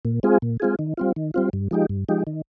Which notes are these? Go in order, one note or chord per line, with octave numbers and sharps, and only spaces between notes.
A#2
G#3 C4 F4 G#4
A#2
G#3 C4 F4 G#4
D#3
G3 C4 F4
D#3
G3 C4 F4
G2
F3 G#3 D#4 G4
G2
F3 G#3 D#4 G4
D#3